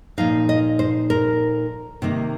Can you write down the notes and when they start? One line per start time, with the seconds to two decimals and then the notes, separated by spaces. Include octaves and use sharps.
0.18 A#2 F3 D#4 F5
0.49 D#5
0.79 C5
1.10 A#4
2.02 C3 D#3 A#3 D#4